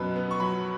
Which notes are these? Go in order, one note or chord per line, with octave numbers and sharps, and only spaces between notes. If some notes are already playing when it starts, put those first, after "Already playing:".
Already playing: F#2 B2 B4
B3
C#6
F#3 B5